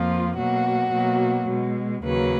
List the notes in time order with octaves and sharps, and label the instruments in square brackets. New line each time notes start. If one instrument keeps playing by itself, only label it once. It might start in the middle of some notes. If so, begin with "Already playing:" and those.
Already playing: [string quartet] F2 F3 A#3 F4
B2 F#3 A#3 F#4
B2 F#3 A#3
B2 G#3
D#2 C#3 F#3 A#3 B4